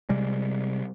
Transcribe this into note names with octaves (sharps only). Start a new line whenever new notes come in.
C3 G3 G#3